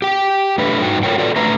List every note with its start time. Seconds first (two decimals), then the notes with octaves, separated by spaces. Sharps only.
0.02 G4 G5
0.58 A3 D4 B4
0.82 G2 D#4 F#4 G5
1.03 F4 G4 A4 A#4 C#5 G5
1.18 F4 F#4 A4 B4 D5
1.36 D3 A3 B4 E5 A#5